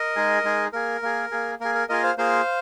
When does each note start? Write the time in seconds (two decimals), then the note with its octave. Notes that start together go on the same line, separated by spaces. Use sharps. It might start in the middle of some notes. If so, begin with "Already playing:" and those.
Already playing: A#4 D#5
0.16 G#3 D#4 G#4
0.44 G#3 D#4 G#4
0.73 A#3 G#4 A#4
1.03 A#3 G#4
1.31 A#3 G#4
1.60 A#3 G#4 A#4
1.75 A#4
1.89 A#3 F4 G#4 A#4 D#5
2.03 C5 F5
2.18 A#3 F4 G#4 C5 F5